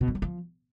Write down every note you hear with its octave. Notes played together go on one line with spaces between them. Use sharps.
B2
G2
F#3
F3